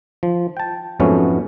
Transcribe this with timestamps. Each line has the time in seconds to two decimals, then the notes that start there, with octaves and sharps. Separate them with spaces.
0.23 F3
0.57 G5 A5
1.00 F2 G#2 F#3 A3 B3 C#4